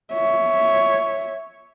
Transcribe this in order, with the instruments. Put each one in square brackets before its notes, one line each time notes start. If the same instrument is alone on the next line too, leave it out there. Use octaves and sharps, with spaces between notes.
[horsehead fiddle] C#5 E5